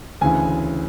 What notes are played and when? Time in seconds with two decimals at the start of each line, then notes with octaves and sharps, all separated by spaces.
0.21 D2 C#3 E3 G#5